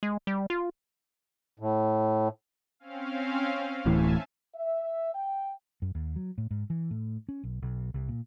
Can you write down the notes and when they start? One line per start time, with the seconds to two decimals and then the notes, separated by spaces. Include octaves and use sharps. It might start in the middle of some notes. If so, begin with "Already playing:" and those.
0.03 G#3
0.27 G3
0.50 F4
1.59 A2
2.79 C4 C#4 F5
3.85 D1 A2 E3 E5 G#5 A5
4.55 E5
5.14 G5
5.82 F#2
5.95 D#2
6.16 F#3
6.38 A2
6.51 G#2
6.70 E3
6.91 A2
7.29 C#4
7.43 B1
7.62 B1
7.94 C2
8.09 A#2